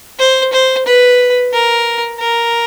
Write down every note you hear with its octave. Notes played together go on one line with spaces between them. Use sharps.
C5
C5
B4
A#4
A#4